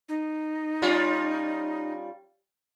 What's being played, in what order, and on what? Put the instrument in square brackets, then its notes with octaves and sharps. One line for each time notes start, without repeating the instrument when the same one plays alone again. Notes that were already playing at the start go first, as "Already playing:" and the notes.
[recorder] D#4
[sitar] G3 C#4 F4